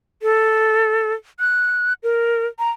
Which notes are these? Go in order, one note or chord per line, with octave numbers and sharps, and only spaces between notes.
A4
F#6
A#4
A#5